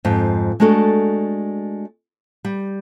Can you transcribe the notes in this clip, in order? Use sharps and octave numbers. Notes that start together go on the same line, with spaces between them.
F2 G#2 F4
G#3 A3 D4 F#4 A4
G3